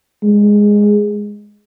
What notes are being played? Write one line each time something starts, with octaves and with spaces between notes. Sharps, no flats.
G#3